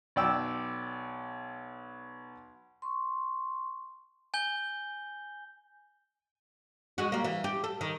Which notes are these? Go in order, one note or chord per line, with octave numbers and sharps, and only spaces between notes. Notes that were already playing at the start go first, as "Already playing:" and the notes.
B1 D5 G5 E6
C6 C#6
G#5 G6 G7
G#3 F#4
G3 A#3
E3
G4
A4
D#3